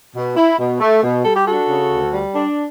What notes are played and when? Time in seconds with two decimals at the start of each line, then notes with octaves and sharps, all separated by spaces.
0.15 B2
0.37 E4
0.59 B2
0.80 A3
1.03 B2
1.24 G3 A4
1.36 G4
1.47 D4 F#4 A4
1.69 C#3
1.91 D2
2.13 G3
2.35 D4